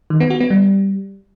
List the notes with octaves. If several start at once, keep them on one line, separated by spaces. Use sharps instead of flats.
D#3
B3
F#4
B3
G3